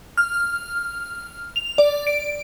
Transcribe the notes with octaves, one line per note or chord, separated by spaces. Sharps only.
F6
F7
D5
D7